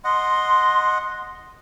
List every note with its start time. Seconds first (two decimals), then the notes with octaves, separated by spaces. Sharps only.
0.05 D#5 F#5 C6